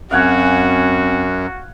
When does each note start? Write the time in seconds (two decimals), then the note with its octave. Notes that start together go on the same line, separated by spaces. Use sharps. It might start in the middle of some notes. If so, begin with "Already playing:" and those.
0.11 F#2 C4 F#4 F5 F#5 G#5